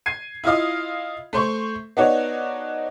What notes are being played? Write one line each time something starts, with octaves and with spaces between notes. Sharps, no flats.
G#6 C7 D#7
E4 F4 D#5 F5 D#6
A3 C5 C#6
B3 D4 D#4 F#4 C#5